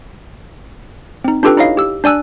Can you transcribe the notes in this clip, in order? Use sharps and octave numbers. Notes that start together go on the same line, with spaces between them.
C4 D#4
D4 F4 G4 A4 B4 G5
D#4 E4 C#5 D#5 F5
G4 E6
D4 D5 G#5 E6 F#6